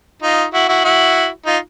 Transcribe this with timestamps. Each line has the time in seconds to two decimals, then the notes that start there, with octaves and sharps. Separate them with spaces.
0.22 D#4 F4
0.53 E4 F#4
0.68 E4 F#4
0.84 E4 F#4
1.46 D#4 F4